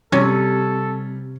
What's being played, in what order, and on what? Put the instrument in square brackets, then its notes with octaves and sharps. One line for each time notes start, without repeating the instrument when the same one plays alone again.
[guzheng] C3 [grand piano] G3 [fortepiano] C#4 [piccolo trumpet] A4